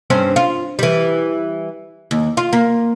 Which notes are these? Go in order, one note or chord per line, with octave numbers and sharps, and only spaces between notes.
G2 C4 C#4
F4
E3 G3
D#2
F4
A#3